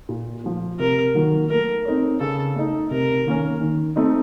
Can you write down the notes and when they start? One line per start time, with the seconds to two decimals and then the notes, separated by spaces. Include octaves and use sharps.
0.09 A#2
0.44 F3 A3
0.79 C3 A#4
1.15 D#3 F#3 A#3 F4
1.50 A3 A#4
1.85 C4 D#4 A4 C#5
2.20 C#3 A4
2.56 A3 D#4
2.91 C3 A#4
3.26 D#3 A#3 C#4
3.61 D#3
3.96 A3 C4 D#4